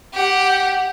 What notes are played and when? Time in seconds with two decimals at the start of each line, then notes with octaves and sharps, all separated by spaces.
0.13 G4 F#5